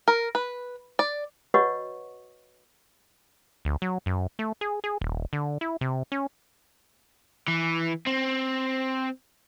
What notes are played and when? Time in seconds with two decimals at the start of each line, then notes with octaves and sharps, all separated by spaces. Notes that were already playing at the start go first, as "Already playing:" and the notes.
0.08 A#4
0.35 B4
0.99 D5
1.54 F#4 B4 C#5 D#5 F#5 C#6
3.65 D2
3.82 F#3
4.06 F#2
4.39 A3
4.61 G#4
4.84 G#4
5.01 D#1
5.33 D3
5.61 E4
5.81 C3
6.12 C#4
7.48 E3
8.07 C4